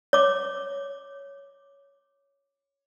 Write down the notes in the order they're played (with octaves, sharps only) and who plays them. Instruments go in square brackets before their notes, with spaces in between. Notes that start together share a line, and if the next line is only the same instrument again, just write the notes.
[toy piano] C#5 D6